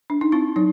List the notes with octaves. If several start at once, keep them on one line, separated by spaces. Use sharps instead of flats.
D4
D#4
C4 E4
F#3 D#4